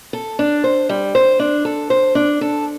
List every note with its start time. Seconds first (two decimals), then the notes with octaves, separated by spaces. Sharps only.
0.13 A4
0.39 D4
0.64 C5
0.89 G3
1.15 C5
1.39 D4
1.65 A4
1.90 C5
2.15 D4
2.41 A4